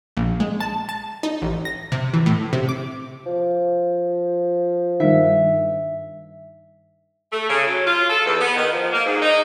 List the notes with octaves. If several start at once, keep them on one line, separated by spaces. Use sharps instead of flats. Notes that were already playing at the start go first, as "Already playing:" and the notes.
A#1
G#3
A5
A5
D#4
A1
A#6
C3
E3
A2
C3
D6
F3
G2 D#3 E5
A3
C#3
F#3
F4
A4
E2
B3
D#3
F3
A#3
G#2
D#4